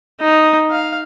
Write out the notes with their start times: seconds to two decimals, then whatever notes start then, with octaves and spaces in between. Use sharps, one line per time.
0.21 D#4
0.71 F5